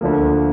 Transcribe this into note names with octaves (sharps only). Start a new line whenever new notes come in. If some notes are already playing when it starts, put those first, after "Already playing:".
D2 D3 F3 A#3